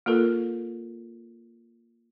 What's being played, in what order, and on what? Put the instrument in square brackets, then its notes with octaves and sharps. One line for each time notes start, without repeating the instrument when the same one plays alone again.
[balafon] A#3 F4 A4 A#4